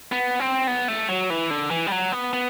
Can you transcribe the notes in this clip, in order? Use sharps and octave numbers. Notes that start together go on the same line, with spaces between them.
B3
C4
B3
A3
F#3
E3
D3
E3
G3
F#3
B3
B3